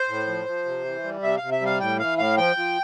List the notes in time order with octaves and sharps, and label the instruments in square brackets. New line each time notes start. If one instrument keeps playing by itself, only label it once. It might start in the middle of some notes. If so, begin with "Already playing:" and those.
Already playing: [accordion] C5
A2
F3
F3
C3
E3
G3
C3 E5
F5
C3
E5
G3 F5
A2 G5
E3 F5
A2 F5
F3 G5
F3